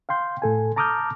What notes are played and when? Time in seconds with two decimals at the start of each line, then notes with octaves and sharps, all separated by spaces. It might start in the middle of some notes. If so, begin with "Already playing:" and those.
0.09 F5 G5 C6 G6
0.42 A2 A4 G#5
0.76 A5 A#5 D6 D#6 F6 G6